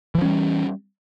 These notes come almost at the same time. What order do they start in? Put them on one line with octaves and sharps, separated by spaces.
E3 F3 C#4 G3